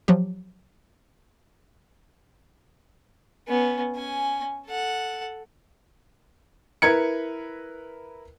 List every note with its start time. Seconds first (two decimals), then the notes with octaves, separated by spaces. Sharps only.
0.08 F3 F#3 G4
3.48 B3 C#4
3.96 C#4 G#5
4.67 A4 F#5
6.82 E4 A#4 B4 G#6 C#7